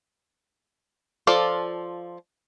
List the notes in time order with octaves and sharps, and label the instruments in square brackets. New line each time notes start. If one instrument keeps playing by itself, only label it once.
[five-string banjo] F3 F4 A4 D5